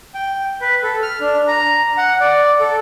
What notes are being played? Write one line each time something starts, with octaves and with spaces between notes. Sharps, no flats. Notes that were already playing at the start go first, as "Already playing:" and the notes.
G5
B4
A4
F6
D4
A#5
F#5
D5
A4